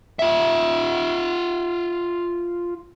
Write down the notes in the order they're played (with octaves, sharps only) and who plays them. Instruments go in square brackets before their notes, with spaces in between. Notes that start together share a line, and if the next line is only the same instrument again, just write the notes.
[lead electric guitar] F4 E5